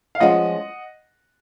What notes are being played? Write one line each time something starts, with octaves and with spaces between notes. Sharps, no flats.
F5
F3 G#3 C#4 F4 D#5 F#5